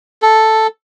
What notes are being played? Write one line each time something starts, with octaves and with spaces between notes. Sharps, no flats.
A4